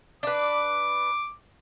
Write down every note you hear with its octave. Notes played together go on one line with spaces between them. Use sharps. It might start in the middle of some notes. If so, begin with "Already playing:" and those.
D4 B4 D6